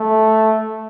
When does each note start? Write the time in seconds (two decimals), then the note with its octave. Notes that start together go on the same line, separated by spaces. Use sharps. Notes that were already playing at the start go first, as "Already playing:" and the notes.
Already playing: A3